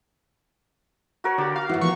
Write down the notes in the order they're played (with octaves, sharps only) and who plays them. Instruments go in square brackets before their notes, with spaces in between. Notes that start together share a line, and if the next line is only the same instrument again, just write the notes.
[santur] F#4 A#4 C#5
[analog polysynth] D3 G4 [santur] D5
[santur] F#4 [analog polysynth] F5
[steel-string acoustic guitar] G2 F#3 [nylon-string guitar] E4 B4 F#5
[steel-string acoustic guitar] F3 A#3 B3 [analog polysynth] C#6